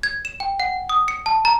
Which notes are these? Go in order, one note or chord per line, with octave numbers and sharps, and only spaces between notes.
G#6
E7
G5
F#5
D#6
C#7
A5
A#5